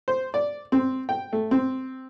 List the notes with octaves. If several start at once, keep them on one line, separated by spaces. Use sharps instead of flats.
C5
D5
C4
G5
A3
C4